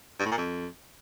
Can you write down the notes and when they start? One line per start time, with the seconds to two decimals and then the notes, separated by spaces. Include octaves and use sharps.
0.20 G2
0.26 A2
0.32 A#2
0.38 F2